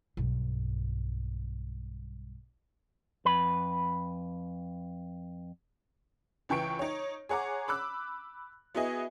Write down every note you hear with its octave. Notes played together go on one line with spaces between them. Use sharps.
B1 G2
F2 B4 B5
C#2 E3 G5 C#6 D7
D#4 C#5
G#4 C#5 F#5 A#5 D6
B5 D6 E6 F#6
B3 E4 F#4 G#4 D#5 G#5